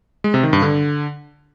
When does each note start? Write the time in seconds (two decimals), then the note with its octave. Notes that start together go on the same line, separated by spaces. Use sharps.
0.24 G#3
0.34 C3
0.43 D#3
0.53 G2
0.62 D3